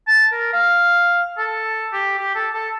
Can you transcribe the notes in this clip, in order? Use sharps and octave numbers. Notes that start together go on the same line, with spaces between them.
A5
A#4
F5
A4
G4
G4
A4
A4